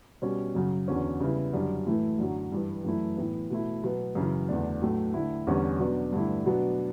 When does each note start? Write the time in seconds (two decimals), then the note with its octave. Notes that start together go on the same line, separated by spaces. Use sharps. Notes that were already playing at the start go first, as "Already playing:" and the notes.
0.22 B2 G3 C#4
0.55 F#2 C#3 F#3
0.88 E2 D3 F#3 C#4
1.20 C#3 G3 B3 E4
1.53 F#2 D3 G3
1.87 A2 E3 A3 E4
2.19 F#2 D3 F#3
2.52 G2 E3 G3
2.84 F#2 E3 A3 E4
3.17 A2 E3 B3
3.50 B2 A3 E4
3.83 B2 F#3 B3
4.15 F#2 C#3 E3
4.49 E2 D3 A3 D4
4.82 A2 F#3 A3
5.14 D3 A3 E4
5.47 E2 D3 G3 C#4
5.79 B2 F#3 B3 D4
6.12 G2 D3 A3 E4
6.46 B2 F#3 B3 D4